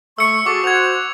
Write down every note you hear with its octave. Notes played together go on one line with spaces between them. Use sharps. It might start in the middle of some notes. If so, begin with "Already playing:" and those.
A3 C#6 E6 C#7
F#4 G#4 A4 C#6 D6 C#7
F#4 C5 F#5 G#6 F7